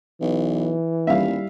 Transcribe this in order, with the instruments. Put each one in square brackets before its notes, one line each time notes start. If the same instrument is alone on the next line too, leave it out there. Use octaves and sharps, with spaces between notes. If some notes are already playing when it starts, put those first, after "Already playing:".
[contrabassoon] B1 [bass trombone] E3
[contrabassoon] D#1 [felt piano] G3 E4 [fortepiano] E5 F5